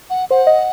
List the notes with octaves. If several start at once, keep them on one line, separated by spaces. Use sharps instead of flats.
F#5
C5 F#5
D#5